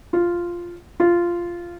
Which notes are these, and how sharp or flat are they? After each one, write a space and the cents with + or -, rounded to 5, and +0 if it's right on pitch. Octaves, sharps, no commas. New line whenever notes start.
F4 -5
F4 -10